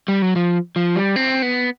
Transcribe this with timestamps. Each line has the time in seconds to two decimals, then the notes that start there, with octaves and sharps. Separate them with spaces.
0.08 G3
0.22 F#3
0.36 F3
0.76 F3
0.96 G3
1.16 C4
1.42 B3